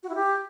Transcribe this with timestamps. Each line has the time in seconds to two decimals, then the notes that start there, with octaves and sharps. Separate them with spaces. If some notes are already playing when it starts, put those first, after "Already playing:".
0.03 F#4
0.09 E4
0.15 G4